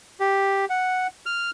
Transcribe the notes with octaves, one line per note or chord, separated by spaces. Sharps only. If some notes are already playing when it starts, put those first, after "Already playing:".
G4
F#5
F6